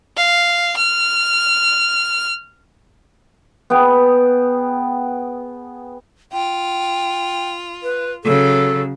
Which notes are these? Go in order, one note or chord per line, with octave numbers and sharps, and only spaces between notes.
F5
F6
B3 G#4 G5
F4 G5
B4
C#3 F#3 A4